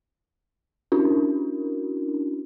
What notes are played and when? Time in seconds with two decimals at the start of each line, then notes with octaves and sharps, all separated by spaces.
0.92 C#4 D4 E4 F#4 A#4